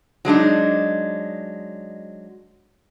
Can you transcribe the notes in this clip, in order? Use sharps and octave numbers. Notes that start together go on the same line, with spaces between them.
F#3 G#3 D4 D#4